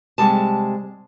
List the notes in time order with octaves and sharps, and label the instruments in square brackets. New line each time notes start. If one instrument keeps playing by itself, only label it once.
[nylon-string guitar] C3 G3 G#3 A5